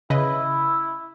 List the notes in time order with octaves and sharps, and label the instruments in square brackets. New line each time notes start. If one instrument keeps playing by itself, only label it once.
[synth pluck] C#3 B4 D#5 [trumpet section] E4